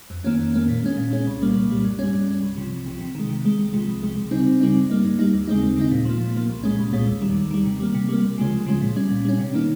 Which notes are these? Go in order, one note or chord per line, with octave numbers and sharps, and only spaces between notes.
F2
D#3 A#3 C#4
F2
D#3 A#3 C#4
A#2
G#3 C#4
A#2
G#3 C#4
C2
A#2 G3 A#3
C2
A#2 G3 A#3
G2
G3 C#4
G2
G3 C#4
C2
C3 F3
C2
C3 F3
C3
D#3 G#3
C3
D#3 G#3
C2
C3 F3 G#3
C2
C3 F3 G#3
C#2
C#3 G3 C4 D#4
C#2
C#3 G3 C4 D#4
G2
G3 A#3 D#4
G2
G3 A#3 D#4
D#2
C#3 G#3 C4 D#4
D#2
C#3 G#3 C4 D#4
A#2
F3 A#3
A#2
F3 A#3
C2
A#2 G#3 C#4
C2
A#2 G#3 C#4
D#2
D#3 G3
D#2
D#3 G3
C3
G3 A#3
C3
G3 A#3
C#2
C#3 F3 G#3 C#4
C#2
C#3 F3 G#3 C#4
A#2
G3 C#4
A#2
G3 C#4
C3
D#3 A#3 D#4